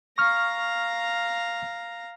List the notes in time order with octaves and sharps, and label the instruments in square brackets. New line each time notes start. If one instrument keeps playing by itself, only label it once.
[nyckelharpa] F5 A#5 [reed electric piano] C#6 F6